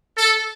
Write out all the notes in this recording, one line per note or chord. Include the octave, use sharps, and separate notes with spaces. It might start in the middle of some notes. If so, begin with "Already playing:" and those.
A4